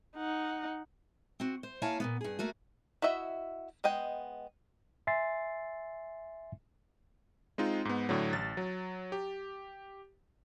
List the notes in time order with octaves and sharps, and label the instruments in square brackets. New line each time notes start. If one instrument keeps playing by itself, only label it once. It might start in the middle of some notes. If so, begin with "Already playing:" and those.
[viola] D#4 F#5
[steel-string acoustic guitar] C4 F#4
C5
A#3 E4 C#5 F5 G#5 A5
A#2 F3 B3
G2 G#4
A3 A#3 F#4
[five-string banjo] E4 F#4 D#5 E5
G#3 B3 D#5 G5
[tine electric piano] E5 G#5 C6 A6 C7
[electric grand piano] G#3 C4 D#4 F4
G#2 B3
A2 D3 F#3
A1 A6
F#3
G4